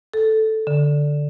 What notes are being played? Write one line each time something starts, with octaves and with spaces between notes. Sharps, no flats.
A4
D3